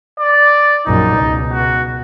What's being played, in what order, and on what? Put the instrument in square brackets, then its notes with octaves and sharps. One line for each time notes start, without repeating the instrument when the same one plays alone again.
[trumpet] D5
[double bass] A#1 F#2 [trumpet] D#4
[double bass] C#2 B2
[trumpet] F#4